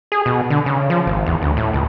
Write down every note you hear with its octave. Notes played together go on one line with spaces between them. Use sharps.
G#4
B2
D3
C#3
F3
G#1
E2
D2
A2
C#2